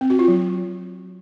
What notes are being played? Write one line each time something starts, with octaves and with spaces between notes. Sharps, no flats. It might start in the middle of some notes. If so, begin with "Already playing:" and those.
C4
F#4
F4
F#3